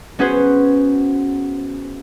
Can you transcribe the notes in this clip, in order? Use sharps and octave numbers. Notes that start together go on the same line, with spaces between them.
B3 C#4 F#4 G#4 B4 C5